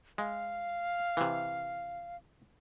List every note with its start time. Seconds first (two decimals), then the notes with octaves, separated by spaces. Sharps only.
0.18 G#3 F5
1.17 C3 E3